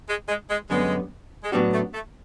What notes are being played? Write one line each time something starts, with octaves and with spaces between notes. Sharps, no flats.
G#3
G#3
G#3
F#2 D3 G3 G#3 B3
G#3
A2 F#3 G3 B3 D4 F#4
A3
A3